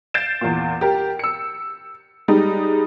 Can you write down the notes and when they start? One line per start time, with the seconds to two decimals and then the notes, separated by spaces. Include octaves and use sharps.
0.14 G6 A6 C7 D7 E7
0.41 E2 A#2
0.81 G4 A#4
1.19 E6 C#7
2.28 G3 G#3 D#4